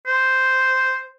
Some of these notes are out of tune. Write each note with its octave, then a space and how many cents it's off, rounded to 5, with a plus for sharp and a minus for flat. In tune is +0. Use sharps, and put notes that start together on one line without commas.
C5 -5